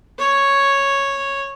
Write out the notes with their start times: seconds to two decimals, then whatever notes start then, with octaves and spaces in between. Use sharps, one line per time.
0.18 C#5